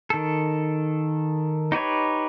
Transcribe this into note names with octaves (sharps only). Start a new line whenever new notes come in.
D#3 A4
D#4 G4 B4 C#5